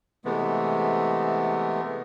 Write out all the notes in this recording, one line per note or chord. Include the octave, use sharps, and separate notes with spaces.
C3 E3 G#3 A3 B3